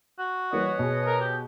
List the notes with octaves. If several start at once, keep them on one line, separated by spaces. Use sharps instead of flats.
F#4
E3 G3 A#3 B4 C#5 D#5
B2 G#4
A#4
G4